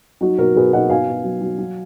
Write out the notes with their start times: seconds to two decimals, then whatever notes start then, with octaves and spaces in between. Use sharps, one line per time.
0.21 F#3 D#4 F#4
0.38 B2 F#4 A#4
0.56 B2 G#4 B4
0.73 B2 D#5 F#5
0.90 B2 F5 G#5
1.08 B2
1.24 F#3
1.41 F#3
1.58 F#3